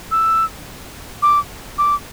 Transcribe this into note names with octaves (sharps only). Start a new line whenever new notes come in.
E6
D6
D6